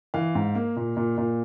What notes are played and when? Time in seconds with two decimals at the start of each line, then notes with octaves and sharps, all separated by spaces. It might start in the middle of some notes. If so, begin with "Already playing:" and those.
0.14 E3 F5
0.35 G#2
0.55 A#3
0.76 A#2
0.97 A#2
1.18 A#2